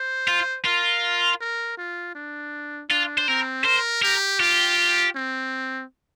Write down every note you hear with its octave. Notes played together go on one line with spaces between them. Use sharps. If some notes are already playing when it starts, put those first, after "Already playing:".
Already playing: C5
F4
F4 A#4
A#4
F4
D4
D4 F4
C5
C4 A#4
A#4 C5
G4 A#4
F4 G4
C4